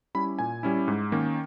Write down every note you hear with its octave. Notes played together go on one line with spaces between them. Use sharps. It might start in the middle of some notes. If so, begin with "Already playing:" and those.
G3 C#4 E4 B5
A#2 G#5
G3 C#4 E4
G#2
D#3 A#3 C#4